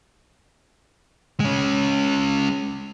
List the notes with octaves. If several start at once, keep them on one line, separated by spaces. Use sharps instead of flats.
G#3 C#4